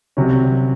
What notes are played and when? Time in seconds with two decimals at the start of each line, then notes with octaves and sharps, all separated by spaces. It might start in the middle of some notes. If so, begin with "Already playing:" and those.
0.17 C2 C3 F#3 C#4